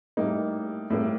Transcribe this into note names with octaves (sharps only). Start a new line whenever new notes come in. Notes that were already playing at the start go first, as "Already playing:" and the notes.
A2 G3 A#3 D#4
A2 G3 A#3